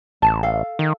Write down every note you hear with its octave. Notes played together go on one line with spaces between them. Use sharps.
A1 A5
A4 F5
D#3